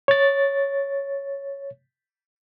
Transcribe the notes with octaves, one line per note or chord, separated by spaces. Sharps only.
C#5 A6